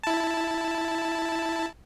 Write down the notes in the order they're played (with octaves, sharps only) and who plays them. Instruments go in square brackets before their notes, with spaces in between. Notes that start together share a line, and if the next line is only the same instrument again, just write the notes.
[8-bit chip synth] E4 A5